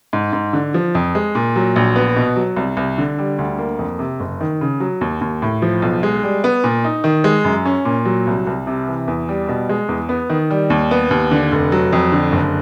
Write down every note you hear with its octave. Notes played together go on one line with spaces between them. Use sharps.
G#2
G#2
D3
F3
F2
G#3
A#2
F#3
A#1
B3
B2
F#3
C2
C2
D3
G3
D2
A#3
F2
C3
F#1
D#3
C#3
F#3
D#2
D#2
A2
F3
B1
G#3
G3
B3
A#2
D#4
D#3
G#3
F#2
C#4
A#2
F#3
C2
C2
C3
E3
E2
G3
B2
G#3
E2
B3
D#3
G3
D#2
B3
D#2
D3
F1
F#3
F2
D3
F#1